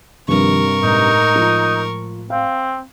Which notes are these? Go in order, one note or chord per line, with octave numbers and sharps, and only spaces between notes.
C2 G2 D#3 F3 A#4 C#6
A2 G#3 D#4
F3
C4 F5